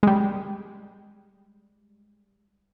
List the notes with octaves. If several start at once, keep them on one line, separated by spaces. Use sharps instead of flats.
G3 G#3